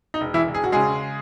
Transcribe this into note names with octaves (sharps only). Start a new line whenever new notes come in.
D#4
E1
E3 E4
E1
G#4
F#4
C#3 G#3 G#4